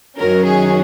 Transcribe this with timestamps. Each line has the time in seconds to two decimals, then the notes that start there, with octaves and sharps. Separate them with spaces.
0.18 F#2 D#3 F#3 C#4 A#4
0.47 G#4